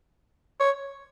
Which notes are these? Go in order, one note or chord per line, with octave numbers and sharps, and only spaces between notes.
C#5